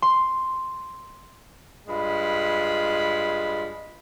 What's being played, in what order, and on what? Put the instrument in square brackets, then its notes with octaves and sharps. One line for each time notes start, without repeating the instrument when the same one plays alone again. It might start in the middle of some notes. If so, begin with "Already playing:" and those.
[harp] C6
[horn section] G2 G#3 F4 B5